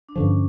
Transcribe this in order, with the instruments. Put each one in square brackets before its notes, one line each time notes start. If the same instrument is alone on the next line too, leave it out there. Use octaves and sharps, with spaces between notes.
[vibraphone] D4
[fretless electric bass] G2 D3 F3 [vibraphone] C#4